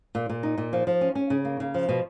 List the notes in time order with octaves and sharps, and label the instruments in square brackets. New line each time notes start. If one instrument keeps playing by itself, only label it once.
[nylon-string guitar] A#2
A#2
D#4
A#2
F3
F3
C#4
C#4
C#3
A#3
C#3
F3
B2